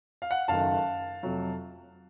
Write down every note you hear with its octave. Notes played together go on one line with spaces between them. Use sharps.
F5
F#5
F#1 F#2 D#3 A3 F5 A5
F2 C3 F#3 A3